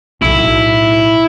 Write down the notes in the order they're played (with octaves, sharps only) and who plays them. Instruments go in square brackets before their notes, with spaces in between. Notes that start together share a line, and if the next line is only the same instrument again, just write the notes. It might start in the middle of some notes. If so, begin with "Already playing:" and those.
[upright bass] B1 A2 [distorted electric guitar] E4